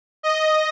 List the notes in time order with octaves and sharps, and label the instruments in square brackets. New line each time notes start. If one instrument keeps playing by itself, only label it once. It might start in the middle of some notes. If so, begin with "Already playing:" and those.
[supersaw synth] D#5